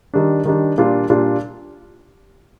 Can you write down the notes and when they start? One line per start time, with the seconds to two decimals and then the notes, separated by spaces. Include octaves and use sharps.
0.14 D#3 G3 D4
0.45 D#3 G3 D4
0.78 A#2 G3 D4 F4
1.10 A#2 G3 D4 F4